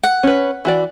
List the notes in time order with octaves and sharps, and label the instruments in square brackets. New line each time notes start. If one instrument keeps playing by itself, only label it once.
[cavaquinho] F#5
[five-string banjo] C#4 B4
E3 F#4 D5